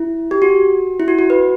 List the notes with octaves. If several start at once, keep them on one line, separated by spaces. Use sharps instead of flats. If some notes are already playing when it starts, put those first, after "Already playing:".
Already playing: E4
G4
F#4
E4
F#4
F#4
B4